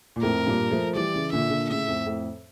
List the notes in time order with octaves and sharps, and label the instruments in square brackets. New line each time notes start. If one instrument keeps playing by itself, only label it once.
[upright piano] A#2
[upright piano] F2 A2 [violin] A#4
[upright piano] G2 A#2
F3 A3
[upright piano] E3 G3 [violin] D5
[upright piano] C#3 E3
[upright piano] A#2 D3 [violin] E5
[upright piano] A#2 D3
[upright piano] A2 C#3 [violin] E5
[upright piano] F2 A2
F2 A2